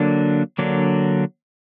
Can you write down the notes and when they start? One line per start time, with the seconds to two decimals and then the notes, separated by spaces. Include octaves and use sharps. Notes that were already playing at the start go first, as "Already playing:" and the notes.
Already playing: D3 F#3 A#3 D4
0.58 D3 F#3 A#3 D4